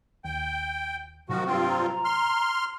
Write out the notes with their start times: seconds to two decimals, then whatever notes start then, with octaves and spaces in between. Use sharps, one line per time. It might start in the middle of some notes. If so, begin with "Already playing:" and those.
0.24 D#2 G5
1.29 A2 C3 D#3 F3 F#3 F#4
1.47 G2 C4 F4 G5
1.69 A#5
2.05 C6 F6